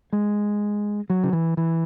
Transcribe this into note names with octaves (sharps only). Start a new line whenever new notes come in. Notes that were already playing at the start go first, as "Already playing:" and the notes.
G#3
F#3
C#3
E3
E3